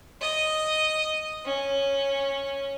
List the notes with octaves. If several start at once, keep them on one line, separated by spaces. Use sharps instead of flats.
D#5
C#4